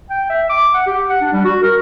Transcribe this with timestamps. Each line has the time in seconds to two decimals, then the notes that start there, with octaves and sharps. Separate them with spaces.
0.10 G5
0.30 E5
0.50 D6
0.74 F#5
0.87 G4
1.10 F#5
1.21 D4
1.33 G3
1.45 F#4
1.63 A#4